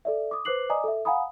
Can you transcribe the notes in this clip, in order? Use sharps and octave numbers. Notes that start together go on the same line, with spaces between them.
A4 D5 E5
D6 D#6
B4 C5 D6 F#6 C7 F#7
D5 D#5 G#5 A#5 D6 D#6
A4 E5
F5 F#5 G#5 A#5 B5 D#6